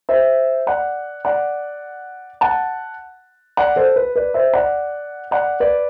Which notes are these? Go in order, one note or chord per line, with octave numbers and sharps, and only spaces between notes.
C5 E5
D5 F#5
D5 F#5
F#5 A5
D5 F#5
A4 C5
B4
B4 D5
C5 E5
D5 F#5
D5 F#5
B4 D5